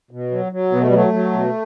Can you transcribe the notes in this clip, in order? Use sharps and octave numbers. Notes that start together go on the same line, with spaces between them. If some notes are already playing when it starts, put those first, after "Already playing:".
B2
F#3
F#3
B2 B3
A3
G3
F#3 A3
F#3
B2